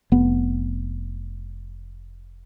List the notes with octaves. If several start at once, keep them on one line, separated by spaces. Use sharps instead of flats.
F1 B3